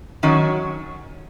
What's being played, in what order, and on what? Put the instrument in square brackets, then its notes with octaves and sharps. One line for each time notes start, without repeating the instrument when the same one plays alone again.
[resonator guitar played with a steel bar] D#3 F#3 C#4